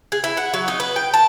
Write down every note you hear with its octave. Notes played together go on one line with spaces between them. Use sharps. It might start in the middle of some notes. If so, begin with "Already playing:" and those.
G#4
E4
F#5
F#3
D#4
B4
G5
A5